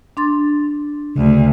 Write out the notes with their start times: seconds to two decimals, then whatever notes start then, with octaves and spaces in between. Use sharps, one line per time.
0.17 D4 C6 A6
1.15 D2 C#3